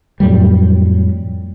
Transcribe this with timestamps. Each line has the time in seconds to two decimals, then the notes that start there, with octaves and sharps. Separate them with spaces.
0.20 F2 A2 F#3 G3